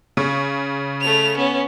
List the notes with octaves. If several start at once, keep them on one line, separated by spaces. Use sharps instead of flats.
C#3 C#6
A3 F7
B3 C#4